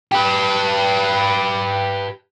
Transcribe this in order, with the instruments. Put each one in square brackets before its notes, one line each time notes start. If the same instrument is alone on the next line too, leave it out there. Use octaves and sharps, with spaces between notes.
[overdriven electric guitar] G4 B4